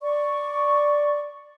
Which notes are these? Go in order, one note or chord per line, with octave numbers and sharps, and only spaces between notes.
D5 C#6